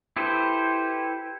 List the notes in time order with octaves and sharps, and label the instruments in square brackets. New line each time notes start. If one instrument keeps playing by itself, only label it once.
[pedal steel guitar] E4 G4 A4 B4 C5